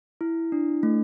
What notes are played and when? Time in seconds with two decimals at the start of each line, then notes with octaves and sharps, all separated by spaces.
0.21 E4
0.52 D4
0.83 A3